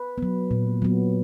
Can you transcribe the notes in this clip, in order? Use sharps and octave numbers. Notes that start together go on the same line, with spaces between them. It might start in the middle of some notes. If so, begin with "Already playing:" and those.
Already playing: B4
F#3 B3
A#2
F#3 B3